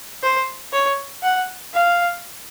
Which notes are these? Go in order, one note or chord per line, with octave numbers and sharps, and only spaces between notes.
C5
C#5
F#5
F5